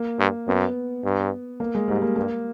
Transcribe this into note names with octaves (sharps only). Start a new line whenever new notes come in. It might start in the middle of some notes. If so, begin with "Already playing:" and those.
Already playing: A#3
G2
F#2 B3
G2
A#3
G#3
G#2 G3
A#3
G2 A#3